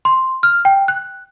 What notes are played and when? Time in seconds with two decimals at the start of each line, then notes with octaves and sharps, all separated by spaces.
0.05 C6
0.43 F6
0.65 G5
0.88 F#6